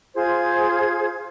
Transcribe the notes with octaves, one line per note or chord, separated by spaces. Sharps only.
F4 G#4 C5 G#6